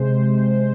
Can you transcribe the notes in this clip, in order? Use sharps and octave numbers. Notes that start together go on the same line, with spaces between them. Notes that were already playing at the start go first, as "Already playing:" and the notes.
Already playing: C3 G#3 C5
C3